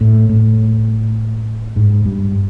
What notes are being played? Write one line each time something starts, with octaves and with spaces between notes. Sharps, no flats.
A2
A2
G#2
G2